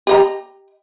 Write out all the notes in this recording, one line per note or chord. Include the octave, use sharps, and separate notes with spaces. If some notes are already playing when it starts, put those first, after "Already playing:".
G4 D#5 A#5